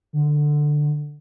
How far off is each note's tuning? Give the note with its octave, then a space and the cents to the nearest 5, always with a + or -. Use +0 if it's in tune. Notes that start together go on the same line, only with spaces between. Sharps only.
D3 +10